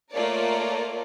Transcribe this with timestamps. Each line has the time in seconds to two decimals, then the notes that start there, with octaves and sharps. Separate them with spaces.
0.13 A3 A#3 F4 A#4 C#5 D5